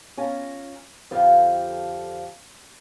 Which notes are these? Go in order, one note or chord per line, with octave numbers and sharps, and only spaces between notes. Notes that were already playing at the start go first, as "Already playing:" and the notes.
C#4 F4 G#5 A#5
F2 D3 F3 F4 G4